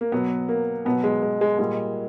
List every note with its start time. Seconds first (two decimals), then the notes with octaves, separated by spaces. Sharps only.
0.01 A#3
0.12 B2 F#3 B3
0.49 A#3
0.85 B2 F#3 B3
1.04 G#3
1.23 G#3
1.41 G#3
1.59 A#2 G3 G#3